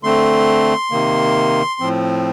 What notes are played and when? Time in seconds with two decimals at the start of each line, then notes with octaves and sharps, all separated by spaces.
0.03 D3 A3 C4 C6
0.91 C3 D#3 A#3
1.80 A2 F3 C4